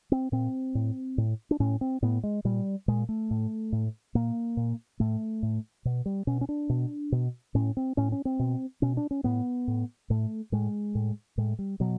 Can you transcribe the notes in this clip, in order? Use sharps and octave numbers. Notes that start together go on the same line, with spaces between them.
C4
A#2 C4
A2
A2
D4
A2 C#4
C4
A2 B3
G#3
A#2 G3
A#2 G#3
A3
A2
A2
A#2 A#3
A#2
A2 A3
A2
B2
G3
B2 C#4
C#4
D4
B2
B2
A2 C#4
C4
A2 C#4
C#4
C4
B2
B2 C#4
D4
C#4
A2 B3
A2
A2 A3
A2 G#3
A2
A2 G#3
G3
B2 F#3